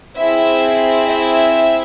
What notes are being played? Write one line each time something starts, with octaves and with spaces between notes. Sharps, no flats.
C4 E4 G#4 E5
E5